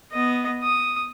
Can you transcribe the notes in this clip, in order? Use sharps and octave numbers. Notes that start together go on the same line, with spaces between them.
B3 D#5
D#6